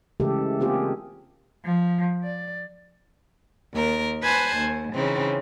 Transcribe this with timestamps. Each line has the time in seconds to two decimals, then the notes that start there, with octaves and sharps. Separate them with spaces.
0.20 C#3 E3 G#3 A3 G4 A4
0.60 A#3 C4 F4 G4 G#4
1.65 F3
2.23 D5
3.72 D#2 A#4
4.22 B4 C5 G#5 A5 F#6
4.56 D#2
4.93 C#3 E3 C4 D#4